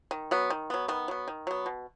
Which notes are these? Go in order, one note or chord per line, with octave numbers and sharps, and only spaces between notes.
D#3
F#3 B3
D#3
F#3 B3
D#3 B3
F#3 B3
D#3
F#3 B3
B2